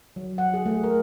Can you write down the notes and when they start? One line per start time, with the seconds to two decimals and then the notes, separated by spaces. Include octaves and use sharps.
0.16 F#3
0.38 F#5
0.54 G#4
0.66 A3
0.84 A#4